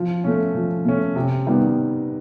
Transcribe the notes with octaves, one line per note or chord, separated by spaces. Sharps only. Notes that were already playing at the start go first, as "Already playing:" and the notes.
Already playing: F3
A3 C#4
F3
A3 C#4
C3
D#3 G3 B3